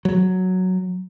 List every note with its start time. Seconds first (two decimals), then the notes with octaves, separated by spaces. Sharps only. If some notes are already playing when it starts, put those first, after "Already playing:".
0.05 F#3